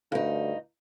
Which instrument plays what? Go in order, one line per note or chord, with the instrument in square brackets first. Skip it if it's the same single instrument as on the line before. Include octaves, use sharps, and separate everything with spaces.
[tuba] D2 [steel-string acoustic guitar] G2 D#4